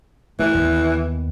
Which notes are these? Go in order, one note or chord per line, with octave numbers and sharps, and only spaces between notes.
E3 A3
D#2 D#3 B3